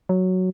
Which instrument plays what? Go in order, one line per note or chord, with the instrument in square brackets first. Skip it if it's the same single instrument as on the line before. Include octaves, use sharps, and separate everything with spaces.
[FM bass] F#3